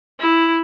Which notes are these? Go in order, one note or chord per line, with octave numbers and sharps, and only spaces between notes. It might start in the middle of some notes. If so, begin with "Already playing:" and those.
E4